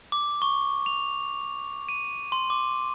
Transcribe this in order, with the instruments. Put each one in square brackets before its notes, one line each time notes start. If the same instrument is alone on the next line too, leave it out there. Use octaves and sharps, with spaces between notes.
[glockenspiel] D6
C#6
F7
D#7
C6
D6